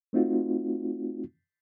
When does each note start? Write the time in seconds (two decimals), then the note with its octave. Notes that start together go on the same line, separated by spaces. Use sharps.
0.13 A3 C4 D#4 F4 F#4